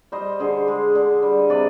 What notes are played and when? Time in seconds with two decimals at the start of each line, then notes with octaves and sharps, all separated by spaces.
0.12 G3 C5 D#5
0.40 D3 G#4 C5
0.68 G#3
0.95 D3
1.23 G3
1.39 D#5
1.50 C3 B4 D5